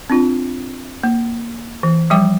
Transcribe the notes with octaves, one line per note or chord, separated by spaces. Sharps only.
C4 D4 F4
A#3
E3
F3 G3 G5 D6